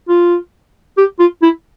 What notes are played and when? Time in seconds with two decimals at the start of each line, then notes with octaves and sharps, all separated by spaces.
0.09 F4
0.98 G4
1.19 F4
1.42 E4